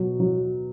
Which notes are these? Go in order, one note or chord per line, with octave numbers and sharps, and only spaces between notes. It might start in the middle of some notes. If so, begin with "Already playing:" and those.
Already playing: B2 F#3
F#3